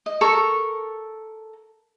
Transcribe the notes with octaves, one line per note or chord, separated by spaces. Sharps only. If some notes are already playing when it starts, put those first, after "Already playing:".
D#5
A4 A#4 C#6